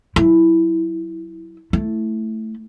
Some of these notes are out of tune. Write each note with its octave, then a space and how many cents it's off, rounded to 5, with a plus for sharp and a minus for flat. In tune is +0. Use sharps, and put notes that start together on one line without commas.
F#3 +5 E4 +0
A3 +0 E4 +0